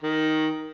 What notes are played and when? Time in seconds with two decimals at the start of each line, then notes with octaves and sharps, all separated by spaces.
0.03 D#3